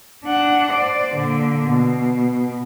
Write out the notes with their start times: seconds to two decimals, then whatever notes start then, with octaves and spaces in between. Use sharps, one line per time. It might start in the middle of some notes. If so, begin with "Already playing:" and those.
0.25 D4 F#5
0.72 C5 D5
1.15 A#2 D3
1.68 B2